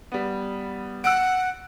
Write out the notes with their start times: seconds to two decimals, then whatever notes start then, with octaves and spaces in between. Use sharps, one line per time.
0.12 G3 B3
1.04 F#5 E6 F#6 D7